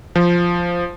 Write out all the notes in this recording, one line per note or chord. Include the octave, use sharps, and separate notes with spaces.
F3